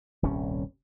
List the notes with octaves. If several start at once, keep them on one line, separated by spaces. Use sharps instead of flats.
D#1 C2 G2 C#4